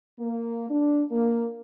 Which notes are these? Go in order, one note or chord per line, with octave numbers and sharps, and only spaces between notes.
A#3
D4
A#3